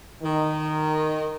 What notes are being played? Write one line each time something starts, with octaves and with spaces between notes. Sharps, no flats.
D#3